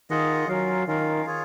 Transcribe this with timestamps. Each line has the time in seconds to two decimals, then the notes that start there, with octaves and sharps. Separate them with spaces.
0.10 D#3 F4 G#4 D#5 F#5
0.48 F#3 C#4 F4 A#4 F5
0.87 D#3 C#4 F4 A#4 F5
1.26 F4 G#4 C#5